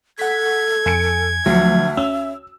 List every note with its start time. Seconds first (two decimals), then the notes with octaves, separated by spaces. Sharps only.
0.19 A4 F#5 G#6 B6
0.86 F2 G#5 C#7 D7
1.46 D2 F3 F#3 E5
1.97 C#4 E6